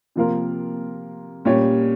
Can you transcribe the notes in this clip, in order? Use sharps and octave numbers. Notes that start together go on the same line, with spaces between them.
C3 F3 A#3 F4 A#4
A#2 G3 C#4 G4 C#5